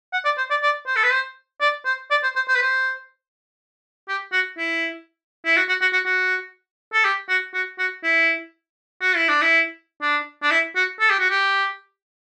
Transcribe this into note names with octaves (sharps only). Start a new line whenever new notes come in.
F#5
D5
C5
D5
D5
C5
A4
B4
C5
D5
C5
D5
C5
C5
C5
B4
C5
G4
F#4
E4
E4
F#4
F#4
F#4
F#4
F#4
A4
G4
F#4
F#4
F#4
E4
F#4
E4
D4
E4
D4
D4
E4
F#4
A4
G4
F#4
G4